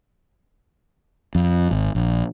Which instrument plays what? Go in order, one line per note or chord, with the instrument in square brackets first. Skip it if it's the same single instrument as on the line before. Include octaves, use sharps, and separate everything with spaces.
[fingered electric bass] F2
G#1
A#1